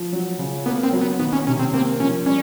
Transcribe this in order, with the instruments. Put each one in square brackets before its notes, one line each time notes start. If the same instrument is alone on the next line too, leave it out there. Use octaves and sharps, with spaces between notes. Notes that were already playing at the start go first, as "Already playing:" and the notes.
Already playing: [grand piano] F3
F#3
C#3
[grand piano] A#3 [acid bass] B3
[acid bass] C4
[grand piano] F#3
[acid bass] B3
[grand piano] D#3 [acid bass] B3
[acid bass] C#4
[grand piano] C3 [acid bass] C#4
[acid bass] C4
[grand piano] A#3 [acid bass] C4
[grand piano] F3 [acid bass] C#4
[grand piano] G3 [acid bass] C#4